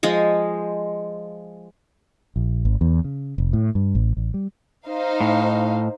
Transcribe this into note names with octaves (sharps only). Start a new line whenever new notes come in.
F3 G#3 D#5
A#1
G#1
E2
C#3
F1
A2
G2
A1
A1
G3
D#4 C5 F5
A2